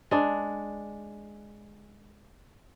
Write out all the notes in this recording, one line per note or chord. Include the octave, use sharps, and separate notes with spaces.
G#3 D4